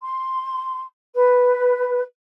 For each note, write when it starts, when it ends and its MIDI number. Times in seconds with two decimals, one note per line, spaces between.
0.02 0.83 84
1.15 2.00 71